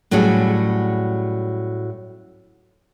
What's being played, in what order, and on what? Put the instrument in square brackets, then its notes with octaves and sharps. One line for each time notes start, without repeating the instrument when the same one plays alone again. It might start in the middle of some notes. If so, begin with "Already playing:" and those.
[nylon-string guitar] A2 F#3 G3 C#4 F#4 G#4